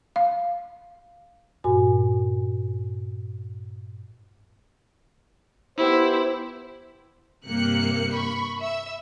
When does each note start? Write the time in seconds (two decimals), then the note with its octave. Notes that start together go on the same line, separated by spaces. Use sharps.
0.16 F5
1.64 G2 A#2 F#4 G#5
5.78 B3 E4 G4 C5
7.47 G2 C3 A#3 G4 F#6 C#7
8.13 B5 C#6
8.60 E5 E6